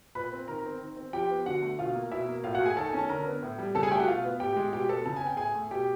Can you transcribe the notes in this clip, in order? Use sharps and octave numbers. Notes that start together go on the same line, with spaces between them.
A#2 B4 B5
C4
D#3 A#4 A#5
C4
D#3
C4
F3 G4 G5
B3
D3 F#4 F#5
A3
B2 F4 F5
A#3
B2 E4 E5
A#3
A2 F4 F5
F#4 F#5
A3
G#4 G#5
D#3 A4 A5
C#4 G#5
A5
D3 A#4 A#5
B3
A2
G3
C#3 A4 A5
G#4 G#5
A3 G4 G5
F#4 F#5
B2 F4 F5
B3
A2 G4 G5
G#3
B2 G4 G5
B3 A4 A5
C#3 A5
G#5
B3 G5
A2 G#4 G#5
A3
B2 G4 G5